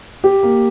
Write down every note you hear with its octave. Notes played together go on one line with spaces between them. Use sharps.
G4
A#3